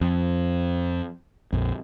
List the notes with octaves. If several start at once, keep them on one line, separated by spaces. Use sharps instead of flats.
F2
A#1 F2